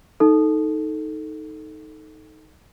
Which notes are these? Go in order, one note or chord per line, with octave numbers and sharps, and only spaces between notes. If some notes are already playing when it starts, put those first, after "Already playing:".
D#4 A4